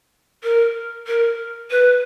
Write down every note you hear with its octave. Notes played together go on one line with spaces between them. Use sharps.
A#4
A#4
B4